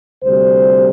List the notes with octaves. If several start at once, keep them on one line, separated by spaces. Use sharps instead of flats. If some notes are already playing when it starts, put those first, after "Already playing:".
D2 C3 G3 C5